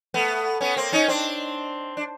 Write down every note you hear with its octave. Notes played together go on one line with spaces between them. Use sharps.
A3 B3
B3 C#4
A#3 C4
C#4 D#4
C4 D4
D4